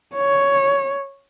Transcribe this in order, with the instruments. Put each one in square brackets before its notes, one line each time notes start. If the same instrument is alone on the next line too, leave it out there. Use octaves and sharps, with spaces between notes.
[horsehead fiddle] C#5